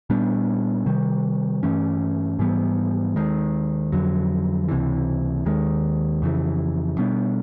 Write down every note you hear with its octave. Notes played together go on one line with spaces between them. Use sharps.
A#2 G3 B3 D4
C3 D#3 G3
G2 E3 A3 C#4
G#2 E3 G3 B3
D#2 D#3 G#3
F2 D3 F#3
C#2 C3 E3
D#2 D#3 G#3
F2 C#3 E3
B2 G3 B3 D4